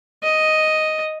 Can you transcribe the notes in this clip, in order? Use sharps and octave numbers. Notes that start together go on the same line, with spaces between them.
D#5